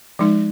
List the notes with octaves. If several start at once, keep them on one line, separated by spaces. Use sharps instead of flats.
F3 G#3 D#4